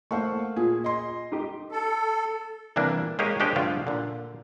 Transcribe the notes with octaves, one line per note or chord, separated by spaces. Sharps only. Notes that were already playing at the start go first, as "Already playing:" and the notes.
A3 A#3 C5 F5 F#5 C#6
A#2 G#4
D#5 C6
D#4 G4
A4
C3 E3 G3 A#3 D4
G#3 A#3 G4 G#4 C#5
G#3 D4 G4 G#4 C5 C#5
G2 D3 F3 A3 F4
A#2 D3